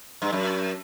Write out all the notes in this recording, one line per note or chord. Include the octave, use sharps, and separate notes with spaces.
G2
F#2